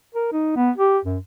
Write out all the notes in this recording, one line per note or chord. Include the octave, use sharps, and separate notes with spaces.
A#4
D#4
B3
G4
F#2